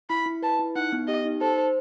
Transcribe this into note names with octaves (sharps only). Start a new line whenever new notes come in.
E4 B5
E4
B4 A5
E4
D#4 F#5
B3
G4 D#5
D#4
A4 C5
C5